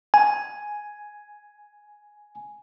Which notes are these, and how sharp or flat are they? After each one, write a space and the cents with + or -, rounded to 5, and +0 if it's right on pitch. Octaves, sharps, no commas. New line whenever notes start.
G#5 +5